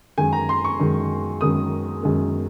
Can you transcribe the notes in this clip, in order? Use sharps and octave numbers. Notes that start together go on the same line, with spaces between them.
F#2 D#3 G#3 G#5
A#5
C6
C#6
F#2 D#3 G#3
F#2 D#3 G#3 D#6
F#2 D#3 G#3